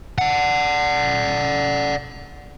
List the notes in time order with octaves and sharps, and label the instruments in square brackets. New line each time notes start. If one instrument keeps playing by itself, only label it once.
[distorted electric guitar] D5 F#5